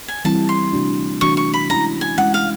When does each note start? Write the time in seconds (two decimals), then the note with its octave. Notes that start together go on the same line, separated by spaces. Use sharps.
0.08 G#5
0.25 E3 G3 C4 E4 A5
0.49 C6
0.73 C3 E3 A3 D4 F#4
1.21 C3 E3 A3 D4 F#4 C#6
1.37 C#6
1.54 B5
1.70 G#3 C#4 E4 A#5
2.01 G#5
2.18 G#3 C#4 E4 F#5
2.34 F5